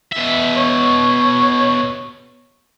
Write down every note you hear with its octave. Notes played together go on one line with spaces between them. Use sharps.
B2 E5
C#5